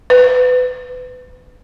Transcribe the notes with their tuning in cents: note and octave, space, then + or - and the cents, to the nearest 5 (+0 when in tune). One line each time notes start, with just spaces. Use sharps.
B4 +25